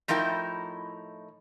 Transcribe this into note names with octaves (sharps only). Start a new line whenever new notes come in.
A2 F3 D#4 E4 A#4 G5